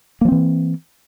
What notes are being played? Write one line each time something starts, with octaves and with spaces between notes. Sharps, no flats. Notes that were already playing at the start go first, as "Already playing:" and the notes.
E3 F3 A#3 C4